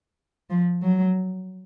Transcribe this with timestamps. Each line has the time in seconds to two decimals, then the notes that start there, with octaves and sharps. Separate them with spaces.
0.50 F3
0.83 F#3